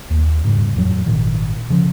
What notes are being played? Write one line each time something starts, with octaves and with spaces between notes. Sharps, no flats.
D#2
E1 G#2 C#3 G3
A1 F2 F#3
G#1 A#2 D#3
C#3 F3